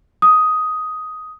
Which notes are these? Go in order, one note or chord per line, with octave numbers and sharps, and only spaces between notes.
D#6